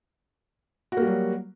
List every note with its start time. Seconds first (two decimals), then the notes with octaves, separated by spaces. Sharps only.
0.92 F#4
0.97 A#3
1.02 G3
1.07 F#3